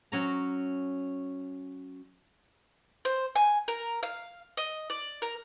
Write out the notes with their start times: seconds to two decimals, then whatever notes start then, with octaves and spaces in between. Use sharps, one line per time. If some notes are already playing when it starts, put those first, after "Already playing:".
0.12 F#3 C#4 A#5
3.05 C5
3.36 G#5
3.68 A#4
4.03 F5
4.57 D#5
4.90 D5
5.22 A#4